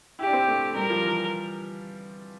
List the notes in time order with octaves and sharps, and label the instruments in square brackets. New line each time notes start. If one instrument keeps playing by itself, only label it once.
[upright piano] E4 [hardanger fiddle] G4
[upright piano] D4
C4
A3
[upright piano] G3 [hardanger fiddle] A#4
[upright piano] F3
E3